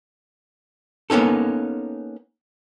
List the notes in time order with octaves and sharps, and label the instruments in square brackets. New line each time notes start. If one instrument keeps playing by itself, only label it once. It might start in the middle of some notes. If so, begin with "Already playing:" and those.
[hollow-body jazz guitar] A#3 B3 C#4 D#4 A4